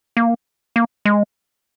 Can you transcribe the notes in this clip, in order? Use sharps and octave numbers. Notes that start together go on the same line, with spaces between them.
A#3
A#3
G#3